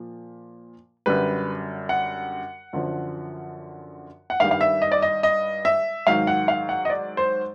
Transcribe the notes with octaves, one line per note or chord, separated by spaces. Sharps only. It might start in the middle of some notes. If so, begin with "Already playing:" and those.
Already playing: A#2 F3
F#2 D3 G3 B4
F#5
F#2 D3 F3
F#5
G2 D#3 G3 F5
F5
E5
D#5
D5
D#5
D#5
E5
G#2 D#3 F#3 F5
F#5
F5
F#5
D#5
D5
C5